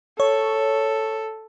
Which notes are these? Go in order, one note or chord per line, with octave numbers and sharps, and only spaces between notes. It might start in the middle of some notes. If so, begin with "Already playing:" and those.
A4 C#5